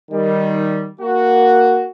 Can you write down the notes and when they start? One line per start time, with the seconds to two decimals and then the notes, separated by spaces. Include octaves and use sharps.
0.11 D#3 G3
1.01 A#3 F#4